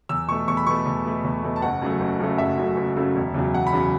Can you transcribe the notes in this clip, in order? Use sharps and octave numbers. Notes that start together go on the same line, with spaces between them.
E2 E6
B2 A3 C#6
E2 C#6
B5
B2 A3 C#6
E2
B2 A3
E2
B2 A3
A5
F#1 F#5
F#2 C#3 F#3 A3
F#1
F#2 C#3 F#3 A3
F#1 E5
F#2 C#3 F#3 A3
F#1
F#2 C#3 F#3 A3
E1
E2 C#3 F#3
E1 F#5
B5
E2 C#3 F#3